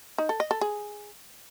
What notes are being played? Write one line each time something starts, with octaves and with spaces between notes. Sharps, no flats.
D#4
A4
D#5
A4
G#4